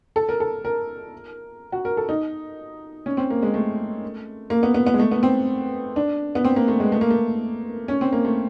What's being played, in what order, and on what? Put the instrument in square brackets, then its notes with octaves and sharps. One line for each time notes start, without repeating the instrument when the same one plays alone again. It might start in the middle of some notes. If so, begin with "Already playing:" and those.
[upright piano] A4
A#4
A4
A#4
F#4
A#4
A4
D#4
C#4
C4
A#3
G#3
A3
A#3
B3
B3
B3
G#3
A3
B3
C4
D4
B3
C4
A#3
A3
G#3
A3
A#3
A3
C#4
C4
A#3
A3